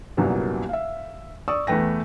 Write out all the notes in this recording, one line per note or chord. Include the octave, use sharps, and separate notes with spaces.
C2 F#2 A#2 F#3 G3 B3
E5 F5
D5 C#6 D#6 E6
E2 E3 A3 B4 G5 A#6